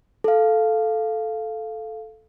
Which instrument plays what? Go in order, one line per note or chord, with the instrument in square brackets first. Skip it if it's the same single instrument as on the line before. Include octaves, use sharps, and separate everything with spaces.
[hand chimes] A4 F5